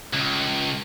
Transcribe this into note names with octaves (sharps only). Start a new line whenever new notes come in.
C#2